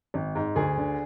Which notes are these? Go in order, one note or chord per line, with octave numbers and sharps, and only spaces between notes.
G#1
G#2
D2 G#4
D3